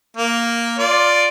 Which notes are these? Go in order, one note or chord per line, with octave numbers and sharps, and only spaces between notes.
A#3
F4 D5